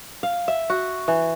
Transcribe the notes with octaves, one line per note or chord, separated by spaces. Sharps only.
F5
E5
F#4
E3